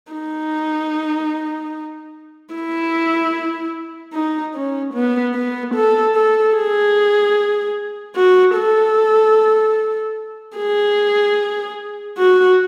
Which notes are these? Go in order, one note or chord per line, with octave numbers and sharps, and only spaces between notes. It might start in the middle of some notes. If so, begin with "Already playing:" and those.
D#4
E4
D#4
C#4
B3
B3
A4
A4
G#4
F#4
A4
G#4
F#4